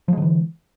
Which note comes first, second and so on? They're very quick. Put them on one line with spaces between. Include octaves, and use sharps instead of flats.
F3 G#3 D3 E3